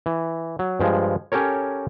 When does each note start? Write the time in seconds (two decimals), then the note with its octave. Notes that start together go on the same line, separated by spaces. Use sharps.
0.06 E3
0.59 F#3
0.80 G2 F3 G#3
1.32 C#4 G4 A4 A#4 C#5